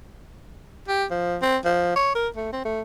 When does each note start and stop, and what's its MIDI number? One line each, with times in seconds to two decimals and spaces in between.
0.88 1.05 67
1.11 1.37 53
1.42 1.57 60
1.65 1.94 53
1.95 2.14 73
2.15 2.28 70
2.36 2.51 57
2.52 2.60 60
2.65 2.81 57